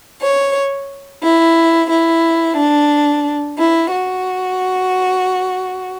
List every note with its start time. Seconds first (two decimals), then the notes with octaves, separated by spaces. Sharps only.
0.20 C#5
1.21 E4
1.89 E4
2.56 D4
3.57 E4
3.91 F#4